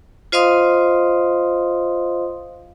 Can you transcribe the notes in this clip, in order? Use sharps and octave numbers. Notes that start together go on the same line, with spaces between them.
F4 C5 D#5 F5 C6 D#6